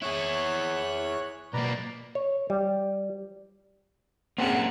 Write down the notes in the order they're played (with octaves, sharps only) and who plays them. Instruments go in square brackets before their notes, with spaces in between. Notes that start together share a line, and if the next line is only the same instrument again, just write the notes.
[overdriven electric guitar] E4 G#4 [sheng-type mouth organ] C#5 F#6
[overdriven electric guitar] B1 A#3 [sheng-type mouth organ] B4 D5 A#5
[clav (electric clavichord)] C#5
G3
[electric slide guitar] A#3 C#4 A4 [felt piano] C4 G#4 [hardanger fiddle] F#5